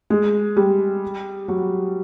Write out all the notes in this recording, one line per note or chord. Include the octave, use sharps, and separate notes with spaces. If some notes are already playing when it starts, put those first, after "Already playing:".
G#3
G3
F#3